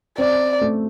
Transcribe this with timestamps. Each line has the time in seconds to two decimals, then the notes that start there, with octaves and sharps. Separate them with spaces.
0.18 C4 D5
0.61 A3